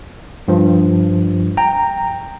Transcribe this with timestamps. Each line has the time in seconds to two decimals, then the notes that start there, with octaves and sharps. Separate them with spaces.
0.48 G2 F3
1.57 G5 A#5